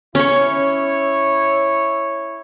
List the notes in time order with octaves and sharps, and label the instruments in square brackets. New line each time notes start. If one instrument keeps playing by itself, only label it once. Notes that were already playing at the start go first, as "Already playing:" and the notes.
[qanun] C#4 C#6 [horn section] E4 C#5